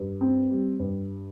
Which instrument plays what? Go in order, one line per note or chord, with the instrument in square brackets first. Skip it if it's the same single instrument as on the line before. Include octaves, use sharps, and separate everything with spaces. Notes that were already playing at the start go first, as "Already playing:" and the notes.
Already playing: [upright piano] G2
C4
G3
G2